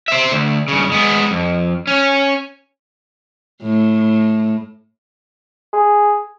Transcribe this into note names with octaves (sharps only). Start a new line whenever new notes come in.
C5 E5
D2
G2 C#3
G#3 B3
F2
C#4
A2
G#4